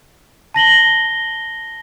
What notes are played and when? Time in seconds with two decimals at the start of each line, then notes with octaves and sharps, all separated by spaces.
0.54 A5 A#6 F#7 G7